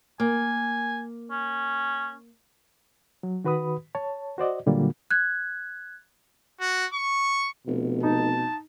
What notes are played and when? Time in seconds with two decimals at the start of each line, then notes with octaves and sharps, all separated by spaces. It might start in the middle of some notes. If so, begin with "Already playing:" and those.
0.20 A#3 G#5
1.31 C#4
3.23 F#3
3.44 D#3 F#4 B4 B5 D#6
3.95 C#5 A5
4.38 F#4 C5 D5 D#5
4.66 A#2 D3 F#3 G3 A#3 F4
5.11 F#6 G#6
6.61 F#4
6.94 C#6
7.67 F1 B2
8.03 D#4 A5